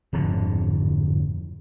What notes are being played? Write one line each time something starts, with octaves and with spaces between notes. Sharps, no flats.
D1 F2 G#2 D3